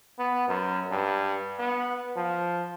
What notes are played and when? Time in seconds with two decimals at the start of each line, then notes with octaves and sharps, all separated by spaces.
0.18 B3
0.48 F#2
0.91 G2
1.59 B3
2.16 F3